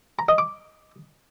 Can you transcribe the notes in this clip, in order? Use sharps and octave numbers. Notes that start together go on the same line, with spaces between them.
A#5
D#5
D6